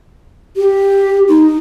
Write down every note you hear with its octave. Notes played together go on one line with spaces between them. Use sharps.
G4
D#4